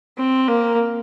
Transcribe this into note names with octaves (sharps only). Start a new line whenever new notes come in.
C4
A#3